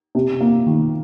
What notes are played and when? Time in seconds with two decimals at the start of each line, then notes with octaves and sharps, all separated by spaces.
0.15 C3
0.41 A#3
0.66 D#3